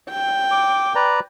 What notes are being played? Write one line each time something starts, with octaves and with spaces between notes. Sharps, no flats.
G5
D6
B4 D5 A#5